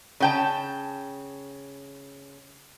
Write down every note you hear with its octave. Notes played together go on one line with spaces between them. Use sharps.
C#3 G5 A5